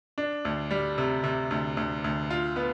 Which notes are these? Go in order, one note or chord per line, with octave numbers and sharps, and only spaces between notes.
D4
D2
G3
C3
C3
D2
D2
D2
F4
B3